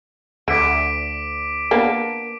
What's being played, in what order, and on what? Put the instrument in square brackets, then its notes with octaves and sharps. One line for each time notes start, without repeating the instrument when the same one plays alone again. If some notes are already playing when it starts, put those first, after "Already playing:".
[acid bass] D2 [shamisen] D3 [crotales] D6 B6 D7
[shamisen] A#3 B3 D4